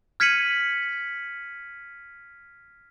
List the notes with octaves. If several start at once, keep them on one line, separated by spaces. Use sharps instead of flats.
F6 G#6 B6 C#7 D#7 F#7